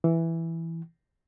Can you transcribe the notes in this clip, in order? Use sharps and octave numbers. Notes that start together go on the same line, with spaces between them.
E3